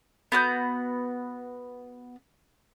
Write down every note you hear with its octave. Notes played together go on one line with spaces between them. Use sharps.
B3 F#4 D6 G6